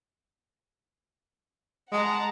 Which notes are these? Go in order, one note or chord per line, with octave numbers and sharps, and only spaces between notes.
G#3 F#5 A5 A#5